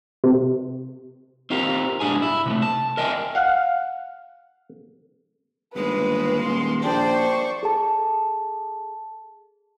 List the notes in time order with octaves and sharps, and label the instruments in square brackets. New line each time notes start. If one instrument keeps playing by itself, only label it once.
[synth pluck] C3
[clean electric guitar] C4 D#4 F4 G4 A#4
C#2 G#2 G3 D4 G#4 G#5
E4
C3 G#3 A3
A5
A#4 D#5 E5 G5 G#5
[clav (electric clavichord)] F5 F#5
[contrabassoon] G1 [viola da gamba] D#3 G#3 A#3 [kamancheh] B4
[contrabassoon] D#1 [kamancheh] C6
[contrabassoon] A#1 [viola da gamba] C5 D5 [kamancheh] G5 A5
[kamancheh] C#6
[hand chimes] G#4 A4 A5